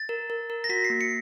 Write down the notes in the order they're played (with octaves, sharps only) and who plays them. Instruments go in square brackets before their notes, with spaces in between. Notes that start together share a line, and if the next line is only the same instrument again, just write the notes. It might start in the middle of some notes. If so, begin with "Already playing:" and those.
Already playing: [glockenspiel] A6
[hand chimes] A#4
A#4
A#4
[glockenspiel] A#6
[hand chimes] F#4 [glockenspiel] B6
[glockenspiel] C7
[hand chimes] A#3
[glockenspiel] C#7